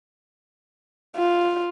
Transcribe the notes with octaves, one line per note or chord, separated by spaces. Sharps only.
F4